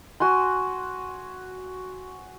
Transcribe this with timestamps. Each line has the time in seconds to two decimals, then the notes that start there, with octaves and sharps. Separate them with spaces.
0.20 F#4 G#5 C6